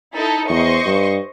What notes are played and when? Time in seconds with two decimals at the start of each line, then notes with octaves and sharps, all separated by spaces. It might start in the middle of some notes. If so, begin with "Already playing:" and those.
0.15 D#4 E4 A4
0.49 E2 C5 D#5 C#6
0.86 G2